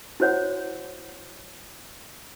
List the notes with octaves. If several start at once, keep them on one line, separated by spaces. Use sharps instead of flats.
E4 F#4 C5 C#5 F#5